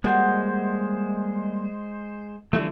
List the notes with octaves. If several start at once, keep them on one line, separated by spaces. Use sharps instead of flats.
G3 G#3 A#3 F#4 C5 F#5
D3 E3 F3 G3 A3